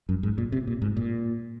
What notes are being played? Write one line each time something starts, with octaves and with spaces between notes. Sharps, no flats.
F#2
G#2
A#2
C3
A#2
G#2
A#2